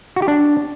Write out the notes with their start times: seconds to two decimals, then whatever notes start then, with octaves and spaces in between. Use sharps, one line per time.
0.16 F#4
0.22 G4
0.28 D4